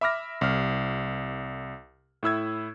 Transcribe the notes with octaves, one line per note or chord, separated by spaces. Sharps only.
E5 B5 D6 F6 A#6
C2 F6
A2 E4 E6 G#6